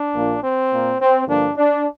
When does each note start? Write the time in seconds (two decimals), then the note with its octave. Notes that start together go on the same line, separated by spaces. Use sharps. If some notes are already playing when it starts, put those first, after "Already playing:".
Already playing: D4
0.15 A#1 A#2 A#3
0.43 C4
0.72 A#2 A#3
1.00 C4
1.28 G2 D3 F3 A#3 D4
1.56 D4